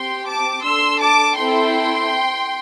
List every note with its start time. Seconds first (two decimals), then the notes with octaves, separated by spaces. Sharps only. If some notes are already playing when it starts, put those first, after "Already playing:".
Already playing: C4 G4 G5 C6
0.27 A5 D6
0.63 D4 A4 C6 E6
1.00 A5 D6
1.36 C4 E4 A4 G5 C6